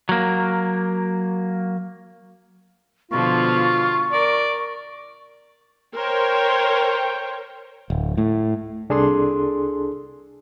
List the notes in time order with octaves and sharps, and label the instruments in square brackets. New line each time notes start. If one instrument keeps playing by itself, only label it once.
[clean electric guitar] F#3 A#3
[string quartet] B2 D3 F3 [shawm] F4 [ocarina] C#6
[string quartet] A#4 [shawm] D5
[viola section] A#4 C5 C#5 [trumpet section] G5
[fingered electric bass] D1
A2
[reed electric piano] C2 D4 G#4 A4 C6